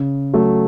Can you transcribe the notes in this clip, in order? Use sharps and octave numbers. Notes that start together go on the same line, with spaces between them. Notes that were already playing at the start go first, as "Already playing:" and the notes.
Already playing: C#3
F#3 A3